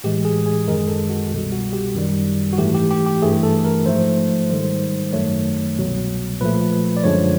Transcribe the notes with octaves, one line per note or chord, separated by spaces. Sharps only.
A2 E3 G#3 G4
G#4
G#4
F#2 D#3 G#3 A#4
A4
F#4
C2 B2 G3
F#4
G4
F#2 D#3 G3
F#4
G#2 E3 A3 G4
G4
G4
G4
G2 E3 A3 G#4
A4
A#4
G#2 F3 A3 C5
G#2 D#3 G3 C5
F#2 D#3 F#3 A3 C#5
C2 B2 F#3
A#2 F3 A3 B4
D5
F#2 D3 F3 G#3 C#5